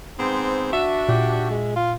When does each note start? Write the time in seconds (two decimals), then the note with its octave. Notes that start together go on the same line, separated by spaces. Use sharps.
0.19 G#2 B3 C4
0.73 D4 F#4 E5
1.09 A#2 G4
1.51 G#3
1.76 F4